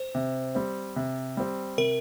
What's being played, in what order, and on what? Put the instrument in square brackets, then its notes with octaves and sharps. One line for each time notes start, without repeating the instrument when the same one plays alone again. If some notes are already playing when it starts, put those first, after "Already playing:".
Already playing: [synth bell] C5
[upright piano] C3
G3 C4
C3
G3 C4
[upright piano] C3 [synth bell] A#4